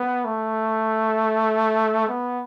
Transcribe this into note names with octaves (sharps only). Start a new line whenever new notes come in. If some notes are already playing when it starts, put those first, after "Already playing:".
Already playing: B3
A3
B3